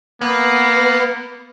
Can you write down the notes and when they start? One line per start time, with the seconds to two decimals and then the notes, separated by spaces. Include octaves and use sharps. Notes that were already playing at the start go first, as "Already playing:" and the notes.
0.21 A#3 B3